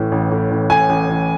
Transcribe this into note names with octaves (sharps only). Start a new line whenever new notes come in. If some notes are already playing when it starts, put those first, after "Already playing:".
Already playing: A1 A2 E3
A1
A2
A1
A2 G#5
A1
A1